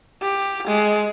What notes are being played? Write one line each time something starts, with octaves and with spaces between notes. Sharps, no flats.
G4
G#3